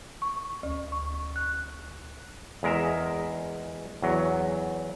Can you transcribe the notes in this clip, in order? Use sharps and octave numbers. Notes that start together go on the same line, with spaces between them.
C#6
D2
C#6
F#6
E2 G#3 A#4 E5
E2 F#3